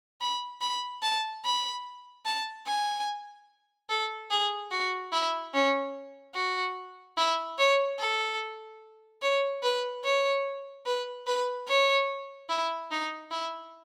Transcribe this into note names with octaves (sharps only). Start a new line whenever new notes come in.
B5
B5
A5
B5
A5
G#5
A4
G#4
F#4
E4
C#4
F#4
E4
C#5
A4
C#5
B4
C#5
B4
B4
C#5
E4
D#4
E4